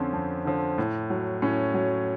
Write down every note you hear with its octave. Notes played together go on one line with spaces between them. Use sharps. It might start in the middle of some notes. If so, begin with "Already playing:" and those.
Already playing: F2 D3 F3 C4 C#4
F2
D3 F3
A2
F#3
A2 C#4
F#3